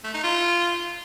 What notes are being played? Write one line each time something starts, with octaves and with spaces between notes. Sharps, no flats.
A3
D#4
F4